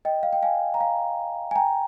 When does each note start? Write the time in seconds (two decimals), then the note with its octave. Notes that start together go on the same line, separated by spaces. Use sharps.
0.05 D#5 G5
0.23 F5
0.33 G5
0.43 F5 G#5
0.74 A#5
0.80 F5 G#5
1.51 G#5
1.56 G5 A#5